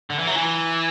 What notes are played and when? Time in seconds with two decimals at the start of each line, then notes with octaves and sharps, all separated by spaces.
0.10 D3
0.19 E3
0.27 F#3
0.35 E3